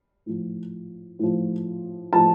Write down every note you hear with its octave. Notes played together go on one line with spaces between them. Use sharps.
A2 F3
A2 F3
A2 F3 A5